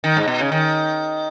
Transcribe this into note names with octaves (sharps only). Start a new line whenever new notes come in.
D#3
G#2
B2
C#3
D#3